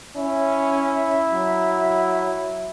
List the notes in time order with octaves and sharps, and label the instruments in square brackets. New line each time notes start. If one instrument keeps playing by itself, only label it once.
[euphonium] C#4 [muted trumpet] E4
[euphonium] F#3